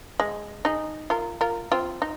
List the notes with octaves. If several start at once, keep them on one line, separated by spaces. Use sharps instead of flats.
G#3
D#4 G#4
F4 A#4
F4 A#4
C4 F4
D#4